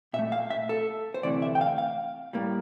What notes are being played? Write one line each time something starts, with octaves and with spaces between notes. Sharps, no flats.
A#2 E5
A3
F5
E5
A4
C5
D2 C3 E3 A3 D5
E5
G5
F5
F5
A2 G3 A#3